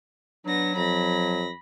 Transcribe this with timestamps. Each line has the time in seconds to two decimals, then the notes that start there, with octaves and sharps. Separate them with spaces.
0.46 F#3 B3 D4 A#6
0.76 F2 B5 A#6